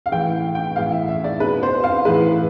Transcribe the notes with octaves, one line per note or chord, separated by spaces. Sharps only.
F5
A2 E3 G5
G5
A2 E3 F5
E5
E5
D5
B2 B4
C5
F5
A2 E3 B4